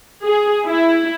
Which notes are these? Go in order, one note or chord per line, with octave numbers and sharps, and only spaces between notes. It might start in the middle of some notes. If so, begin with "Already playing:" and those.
G#4
E4